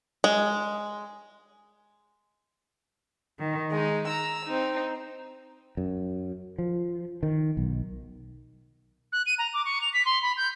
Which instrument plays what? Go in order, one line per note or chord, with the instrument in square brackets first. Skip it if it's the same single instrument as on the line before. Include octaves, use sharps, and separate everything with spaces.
[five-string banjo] G#3
[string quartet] D#3
G#3 D#4
A#5 E6
C4 D#4
[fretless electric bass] F#2
F3
D#3
B1
[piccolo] F#6
D#7
A#5
D6
C#6
F7
B6
C6
B5
G6